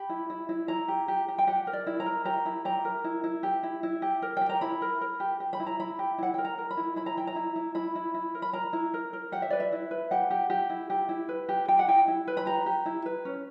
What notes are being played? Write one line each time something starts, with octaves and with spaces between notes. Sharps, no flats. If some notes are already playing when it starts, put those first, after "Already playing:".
Already playing: G4 B5
E4
E4
E4
E4 A#5
G4
G4
G4
G5
G4 F#5
A#4
D5
E4
A#5
A#4
G4 A#5
E4
G4 A#5
A#4
E4
E4
G4
E4
E4
G4
A#4
G4 G5
A#5
E4 B5
A#4
A#4
G4
G4
B5
E4
A#5
E4 B5
G4
E4 F#5
A#4 G5
A#5
A#4
B5
E4
E4 B5
A#5
E4 G5
A#5
E4
E4
E4 B5
E4
E4
A#4
B5
A#4 A#5
E4
A#4
A#4
G4 F#5
E5
B4 D5
E5
E4
B4
G4 F#5
G4
G4
E4
G4
E4
B4
G4
G4 G5
F#5
E4 G5
E4
B4
B5
G4 A#5
G4
E4
B4
C#4